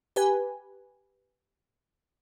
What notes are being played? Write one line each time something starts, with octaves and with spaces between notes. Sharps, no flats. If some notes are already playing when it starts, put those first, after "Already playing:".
G4 B4 G#5